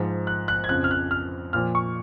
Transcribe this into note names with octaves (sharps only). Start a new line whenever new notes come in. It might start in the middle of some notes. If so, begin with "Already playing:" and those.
Already playing: G#2 F3
F#6
F#6
G#6
F2 C#3 F3 F#6
F6
F#6
F6
A#2 F3 F6
C#6